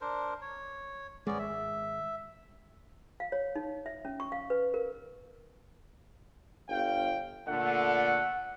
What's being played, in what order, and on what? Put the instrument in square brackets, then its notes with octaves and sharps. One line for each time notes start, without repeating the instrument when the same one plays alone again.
[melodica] D4 A#4 C5
C#5
[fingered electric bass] G#1 C#2 G#3 [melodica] B3 C#4 D5
[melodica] E5
[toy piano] F5
C#5
D#4
E5
C#4
C#6
F5
B4
A#4
[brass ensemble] G1 F5 G5
[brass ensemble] A#2 D3 A3 [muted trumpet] F#5